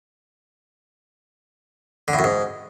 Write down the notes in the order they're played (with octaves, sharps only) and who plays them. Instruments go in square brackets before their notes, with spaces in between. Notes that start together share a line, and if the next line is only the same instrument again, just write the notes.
[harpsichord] D3
A2
F#2
G#2